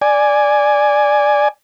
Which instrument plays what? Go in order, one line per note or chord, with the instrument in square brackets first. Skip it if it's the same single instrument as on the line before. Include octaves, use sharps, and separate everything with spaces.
[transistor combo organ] D5 G#5